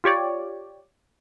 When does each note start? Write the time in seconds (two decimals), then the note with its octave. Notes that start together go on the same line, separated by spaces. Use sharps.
0.04 F4 G4 C#5 D5